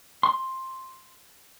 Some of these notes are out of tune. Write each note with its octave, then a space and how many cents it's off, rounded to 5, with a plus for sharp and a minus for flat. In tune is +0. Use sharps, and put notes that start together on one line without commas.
C6 +5